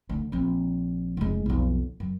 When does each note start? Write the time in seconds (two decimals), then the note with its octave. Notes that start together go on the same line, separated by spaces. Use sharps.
0.09 D2
0.32 A#1 C4
1.17 F1 G#3
1.46 B1 F2
2.00 F#2